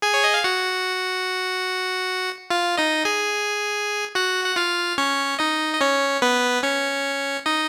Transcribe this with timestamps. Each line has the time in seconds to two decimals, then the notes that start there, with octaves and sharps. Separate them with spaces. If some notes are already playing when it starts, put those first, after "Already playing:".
0.02 G#4 G#5
0.14 C#5
0.24 D#5
0.34 F5
0.44 F#4 F#5
2.50 F4 F5
2.77 D#4 D#5
3.05 G#4 G#5
4.15 F#4 F#5
4.45 F#5
4.56 F4 F5
4.98 C#4 C#5
5.39 D#4 D#5
5.74 D#5
5.81 C#4 C#5
6.22 B3 B4
6.63 C#4 C#5
7.46 D#4 D#5